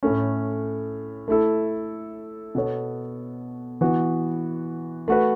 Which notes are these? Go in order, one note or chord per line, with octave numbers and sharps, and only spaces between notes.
A2 A3 C#4
A3 E4 A4
B2 B3 A4 C#5
E3 B3 F#4 B4
A3 F#4 B4